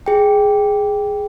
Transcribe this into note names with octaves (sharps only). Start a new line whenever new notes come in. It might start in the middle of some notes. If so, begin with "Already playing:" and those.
G#4 G5